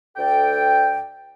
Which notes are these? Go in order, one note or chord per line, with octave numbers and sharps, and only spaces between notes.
D2 A4 D5 G5